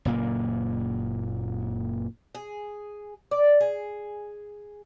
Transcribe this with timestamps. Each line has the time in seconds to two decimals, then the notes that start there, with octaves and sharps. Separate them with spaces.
0.05 F#1 A#2 A#3
2.35 G#4
3.31 D5
3.60 G#4